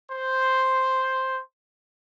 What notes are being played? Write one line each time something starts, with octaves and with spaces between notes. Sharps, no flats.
C5